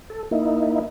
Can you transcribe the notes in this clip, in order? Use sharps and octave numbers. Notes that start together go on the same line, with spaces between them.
A4
A#3 D#4 E4